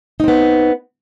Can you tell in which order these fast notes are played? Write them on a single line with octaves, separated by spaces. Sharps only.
D#4 C4 B3